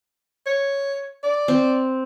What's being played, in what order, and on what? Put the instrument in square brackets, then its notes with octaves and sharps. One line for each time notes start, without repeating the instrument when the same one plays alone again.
[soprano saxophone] C#5
D5
[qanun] C4